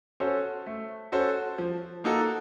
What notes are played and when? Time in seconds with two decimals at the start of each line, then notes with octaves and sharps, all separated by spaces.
0.20 C#4 F#4 A4 C5
0.66 A3
1.12 C#4 F#4 A4 C5
1.58 F3
2.04 A#3 D#4 F#4 A4